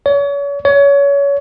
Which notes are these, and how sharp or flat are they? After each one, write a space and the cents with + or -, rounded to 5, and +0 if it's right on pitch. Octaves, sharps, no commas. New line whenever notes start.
C#5 +35
C#5 +25